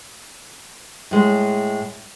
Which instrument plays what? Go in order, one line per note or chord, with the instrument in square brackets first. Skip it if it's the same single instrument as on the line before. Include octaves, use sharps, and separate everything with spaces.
[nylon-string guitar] A2 G#3